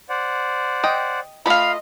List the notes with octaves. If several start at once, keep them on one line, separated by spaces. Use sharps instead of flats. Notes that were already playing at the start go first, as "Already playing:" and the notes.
C5 D5 F#5
D#5 G5
A3 F4 D#5 F5 B5